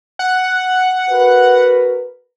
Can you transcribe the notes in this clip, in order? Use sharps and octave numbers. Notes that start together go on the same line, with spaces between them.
F#5
F#4 A#4 B4